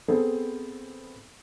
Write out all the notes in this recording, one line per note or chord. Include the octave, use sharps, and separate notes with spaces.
B3 C4 G#4 A4 C5